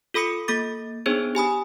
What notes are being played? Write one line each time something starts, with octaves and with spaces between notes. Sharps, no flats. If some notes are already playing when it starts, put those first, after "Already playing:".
F4 A4 B5 D#6 C#7
A#3 A4 D6 A6
B3 D4 D#4 G#4 C5 C#5
G4 G#5 B5 D#6